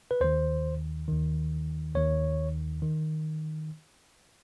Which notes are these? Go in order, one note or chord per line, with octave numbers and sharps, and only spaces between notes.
B4
D#2 D#3 C5
D#2 D#3
D#2 D#3 C#5
D#3